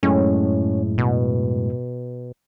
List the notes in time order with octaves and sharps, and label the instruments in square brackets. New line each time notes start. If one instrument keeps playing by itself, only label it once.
[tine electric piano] F#2 A2 G#3 [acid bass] C#4
[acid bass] B2